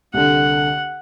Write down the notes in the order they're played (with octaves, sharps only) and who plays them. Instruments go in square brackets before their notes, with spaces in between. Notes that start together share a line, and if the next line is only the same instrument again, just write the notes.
[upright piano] C2 D3 [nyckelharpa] F#5